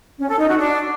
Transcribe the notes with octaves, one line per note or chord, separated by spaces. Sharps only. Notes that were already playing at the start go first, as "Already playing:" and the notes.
C#4
A4
D#4
F#4
D4